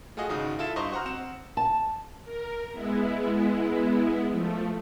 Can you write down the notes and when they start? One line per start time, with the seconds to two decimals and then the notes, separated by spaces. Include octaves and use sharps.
0.17 A3 F4 F#4 G#4 D#5
0.29 G#1 C#3 D#4 F#4 D#6
0.59 E4 F4 A4 E5 E7
0.76 G2 C5 D#5 A#5 C6 C#6
0.92 F#4 C5 F#5 A#5 F6
1.06 C4 F#5 E7
1.57 A5
2.25 A#4
2.72 G#3 B3 E4
4.31 F3 A3